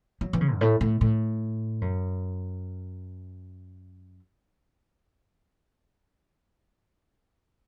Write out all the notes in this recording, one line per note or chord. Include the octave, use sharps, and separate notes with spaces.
F#3
E3
C#3
F#2
A2
A2
A2
F#2